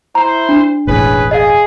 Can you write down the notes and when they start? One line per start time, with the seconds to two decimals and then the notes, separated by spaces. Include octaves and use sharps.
0.15 E4 C5 A#5
0.49 D4
0.87 E1 A1 E3 C#4 G#4 B4
1.31 G#4 D#5 F5